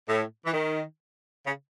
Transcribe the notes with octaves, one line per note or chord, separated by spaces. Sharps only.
A2
E3
D#3
C#3